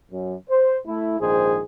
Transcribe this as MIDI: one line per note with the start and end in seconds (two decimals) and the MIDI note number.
0.11 0.35 42
0.49 0.77 72
0.87 1.19 57
0.87 1.19 64
1.20 1.60 34
1.20 1.60 44
1.20 1.60 51
1.20 1.60 68
1.20 1.60 72